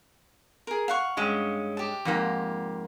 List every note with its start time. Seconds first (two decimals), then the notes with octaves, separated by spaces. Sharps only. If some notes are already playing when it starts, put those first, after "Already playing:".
0.67 G#4 A#4
0.88 F5 F#5 C#6
1.17 G2 G#3 C#4
1.77 G4 A5
2.05 F2 G#2 A#3